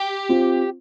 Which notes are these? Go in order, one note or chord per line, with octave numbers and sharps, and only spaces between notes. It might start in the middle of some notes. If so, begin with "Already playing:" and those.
Already playing: G4
C4 F4